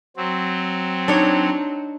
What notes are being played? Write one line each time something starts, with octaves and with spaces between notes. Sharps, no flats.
F#3 C4
D4 D#4 C#5